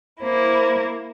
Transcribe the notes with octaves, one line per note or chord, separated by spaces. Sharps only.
A#3 E4 C5